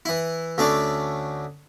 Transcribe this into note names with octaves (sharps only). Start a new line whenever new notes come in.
E3 E4
D2 A3 C#4 D4 D5